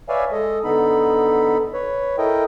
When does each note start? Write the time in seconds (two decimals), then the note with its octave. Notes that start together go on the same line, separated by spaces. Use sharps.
0.09 B4 C#5 D5 E5 F5 G#5
0.32 G#3 A4 D#5
0.64 D3 B3 D#4 A4 B5
1.74 B4 C#5
2.18 E4 A4 A#4 D#5 G5